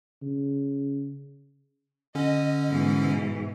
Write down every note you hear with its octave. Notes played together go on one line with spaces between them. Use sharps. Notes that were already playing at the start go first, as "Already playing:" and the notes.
C#3
D3 C#4 D#5
G#2 B2 E3